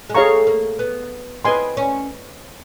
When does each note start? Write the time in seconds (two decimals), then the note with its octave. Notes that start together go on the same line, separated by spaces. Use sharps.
0.10 G#3
0.15 A3 G#4 C#5 F5 A#5 C#6
0.47 A#3
0.79 B3
1.45 C4 B4 D#5 G#5 C6
1.77 C#4